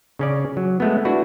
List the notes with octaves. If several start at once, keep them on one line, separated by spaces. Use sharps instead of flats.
C#3 C#4 D5
F#3
G#3 A3 B3
D4 E4 F#4 B4